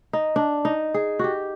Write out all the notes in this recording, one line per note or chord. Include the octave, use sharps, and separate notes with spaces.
D#4
D4
D#4
G#4
F#4 G4